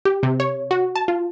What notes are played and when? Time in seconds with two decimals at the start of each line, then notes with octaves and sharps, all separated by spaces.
0.05 G4
0.23 C3
0.40 C#5
0.71 F#4
0.96 A5
1.08 F4